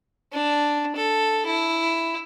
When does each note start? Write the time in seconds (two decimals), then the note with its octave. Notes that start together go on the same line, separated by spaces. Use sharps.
0.33 D4
0.96 A4
1.46 E4